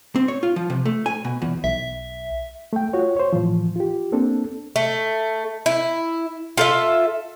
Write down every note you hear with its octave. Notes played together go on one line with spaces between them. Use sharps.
C4
C#5
F4
F3
C3
A3
G#5
B2
E2
B1 E5
A3 G5
F4 F#4 C#5
C5 C#5
A2 E3 F3
F4 G4
A#3 C4 D4 A4
A3
E4
F4 A4 E5